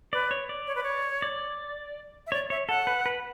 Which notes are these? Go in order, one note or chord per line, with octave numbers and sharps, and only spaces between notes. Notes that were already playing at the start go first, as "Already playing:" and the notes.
B4 D5
C#5
D5
C#5
B4
C#5
D5
E5
C#5 D5
C#5 E5
A4 F#5
B4
B4